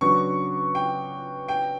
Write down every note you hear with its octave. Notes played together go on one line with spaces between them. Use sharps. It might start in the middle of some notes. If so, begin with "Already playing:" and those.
C#3 F#3 B3 D4 F#4 C#6
G5
G5